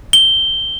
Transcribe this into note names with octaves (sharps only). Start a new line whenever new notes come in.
G7